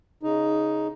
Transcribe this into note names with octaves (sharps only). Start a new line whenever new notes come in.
C#3 D#4